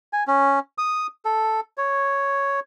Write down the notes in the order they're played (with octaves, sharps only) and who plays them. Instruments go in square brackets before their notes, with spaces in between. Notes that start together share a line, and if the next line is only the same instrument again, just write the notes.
[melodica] G#5
C#4
D#6
A4
C#5